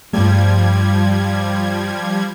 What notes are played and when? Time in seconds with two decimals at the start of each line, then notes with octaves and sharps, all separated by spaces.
0.13 G2 F3 G3 A3 G#6